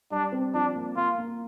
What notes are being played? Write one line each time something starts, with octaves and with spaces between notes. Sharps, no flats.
G3 D4
C4
F3 D4
A#3
A#3 F4
A#3